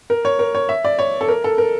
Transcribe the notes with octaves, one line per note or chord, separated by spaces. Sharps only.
A#4
C#5
A#4
C#5
E5
D5
C#5
A4
A#4
A4
A#4